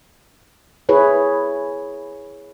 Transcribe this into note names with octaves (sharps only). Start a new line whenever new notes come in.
E4 G#4 B4 C#5